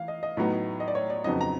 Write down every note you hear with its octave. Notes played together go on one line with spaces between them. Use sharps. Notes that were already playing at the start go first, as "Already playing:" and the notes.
Already playing: E3 F5
D#5
D#5
A2 F#3 B3 D#4
D#5
D5
C#5
D5
F2 C#3 F#3 B3 D#4 D#5
A#5